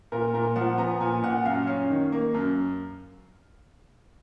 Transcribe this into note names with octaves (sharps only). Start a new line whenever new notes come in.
A#2 A#4
A#2 A#4
F3 F#5
B3 A#5
A#2 G#5
A#2 F#5
F#2 F5
C#4
D#3
A#3
F#2